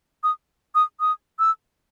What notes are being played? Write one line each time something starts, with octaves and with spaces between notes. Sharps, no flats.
D#6
D#6
D#6
E6